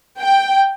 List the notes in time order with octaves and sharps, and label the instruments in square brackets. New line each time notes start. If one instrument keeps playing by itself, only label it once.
[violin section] G5